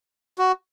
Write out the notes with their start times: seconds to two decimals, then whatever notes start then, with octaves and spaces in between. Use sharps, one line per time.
0.38 F#4